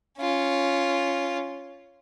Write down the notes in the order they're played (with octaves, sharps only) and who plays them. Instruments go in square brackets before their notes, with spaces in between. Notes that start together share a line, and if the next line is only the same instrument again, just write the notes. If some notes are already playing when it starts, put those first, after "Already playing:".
[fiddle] C#4 F4